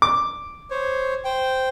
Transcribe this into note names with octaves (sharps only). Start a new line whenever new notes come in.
D6
C5 C#5
C5 G5